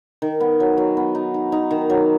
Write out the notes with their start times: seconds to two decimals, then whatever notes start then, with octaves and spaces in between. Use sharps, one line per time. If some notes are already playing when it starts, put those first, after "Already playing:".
0.22 D#3
0.40 B3
0.60 F#3
0.77 F#3
0.97 B3
1.15 D#4
1.34 D#4
1.52 D#4
1.71 D#3
1.90 F#3